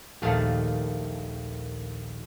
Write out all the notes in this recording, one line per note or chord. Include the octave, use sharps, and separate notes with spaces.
A#1 D#2 D#3 A3 F5 A5